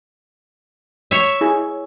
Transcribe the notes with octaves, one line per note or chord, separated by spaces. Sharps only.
C#5 E5
E4 G#4